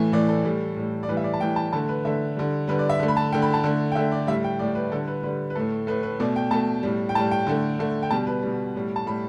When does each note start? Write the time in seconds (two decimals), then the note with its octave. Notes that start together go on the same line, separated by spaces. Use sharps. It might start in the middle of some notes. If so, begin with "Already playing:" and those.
Already playing: A2 E3 A3
0.12 A2 E3 A3 D5
0.29 A4
0.45 A2 G3
0.76 A2 G3
1.03 D5
1.08 A2 E3 G3 B4
1.17 E5
1.24 D5
1.34 A5
1.40 A2 E3 G3 G5
1.56 A5
1.73 D3 A3 A5
1.89 B4
2.05 D3 A3 E5
2.36 D3 G3
2.68 D3 G3 B4
2.79 D5
2.89 E5
3.00 D3 A3
3.08 B5
3.17 A5
3.32 D3 A3 G5
3.42 B5
3.54 A5
3.64 D3 A3
3.92 G5
3.95 D3 A3 E5
4.12 D5
4.27 G3 E5
4.31 A2
4.44 G5
4.59 A2 G3 D5
4.75 B4
4.91 D3 G3 A4
5.07 B4
5.23 D3 G3 B4
5.50 B4
5.55 A2 A3 A4
5.87 A2 A3 B4
6.03 B4
6.20 B2 A3 D5
6.36 G5
6.51 B2 A3 A5
6.83 A2 G3
7.09 G5
7.15 A2 G3 A5
7.31 G5
7.47 D3 A3
7.79 D3 A3
8.03 G5
8.11 B2 G3 A5
8.27 B4
8.42 B2 G3
8.75 A2 G3
8.96 A5
9.06 A2 G3 B5